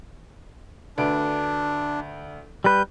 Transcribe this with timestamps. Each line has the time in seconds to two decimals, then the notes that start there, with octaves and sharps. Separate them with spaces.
0.98 D2 D4 B4 D7
2.64 G3 B4 G6